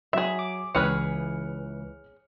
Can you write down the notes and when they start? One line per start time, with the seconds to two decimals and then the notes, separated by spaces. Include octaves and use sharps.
0.13 F#3 G#4 E5
0.39 D6
0.75 C#2 E3 C#4 G#4 B4 F6 F#6 C#7